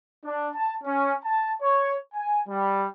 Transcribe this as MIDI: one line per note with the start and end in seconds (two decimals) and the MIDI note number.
0.25 0.48 62
0.55 0.73 81
0.84 1.14 61
1.24 1.53 81
1.62 1.95 73
2.14 2.42 80
2.49 2.85 55